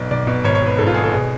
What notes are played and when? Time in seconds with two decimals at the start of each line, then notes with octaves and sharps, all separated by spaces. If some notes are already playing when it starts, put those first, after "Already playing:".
Already playing: B1 B2 D5
0.11 B1 D5
0.27 B2
0.44 G#1 C#5
0.55 C#5
0.61 G#1 B4
0.78 G#2 A4
0.87 F4
0.94 G#1 G#4
1.04 A4
1.12 B2 G#4